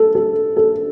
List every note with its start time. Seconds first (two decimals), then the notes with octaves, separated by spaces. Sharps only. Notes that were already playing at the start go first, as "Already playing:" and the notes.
Already playing: A4
0.15 A4
0.57 A4